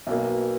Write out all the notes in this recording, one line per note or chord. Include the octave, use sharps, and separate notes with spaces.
B1 B2 A#3